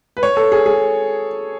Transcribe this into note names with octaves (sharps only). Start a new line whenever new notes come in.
B4
C#5
A4
G#4
G#4